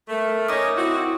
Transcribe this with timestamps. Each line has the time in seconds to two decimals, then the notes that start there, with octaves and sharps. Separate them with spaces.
0.08 A3 A#4
0.48 C#4 D#4 C#5 D6 D#6 A#6
0.76 C4 E4 F#4